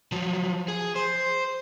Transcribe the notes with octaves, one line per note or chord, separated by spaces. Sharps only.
F3 F#3
G#4
C5